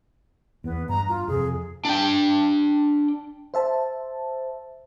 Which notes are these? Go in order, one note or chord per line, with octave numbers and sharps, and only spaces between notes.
E2 B3
G2 A#5
F4
F2 C3 G#4
D4 G5
C5 E5 A5